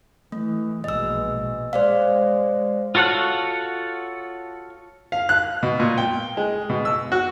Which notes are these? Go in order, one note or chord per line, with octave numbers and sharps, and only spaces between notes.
E3 A3
A#1 B2 G#3 D#5 E6
G#3 C5 D5 F5
F4 F#4 A4 C#5 F#5
F5
F#6
B2
A#2
G5
G#3
B2
E6
F#4